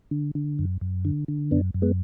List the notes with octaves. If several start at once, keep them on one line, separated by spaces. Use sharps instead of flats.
D3
D3
F#2
F#2
D3
D3
F#2 B3 D4
F#2
G#3 B3